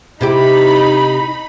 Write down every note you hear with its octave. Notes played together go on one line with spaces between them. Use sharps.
C3 D#4 E4 G4 B5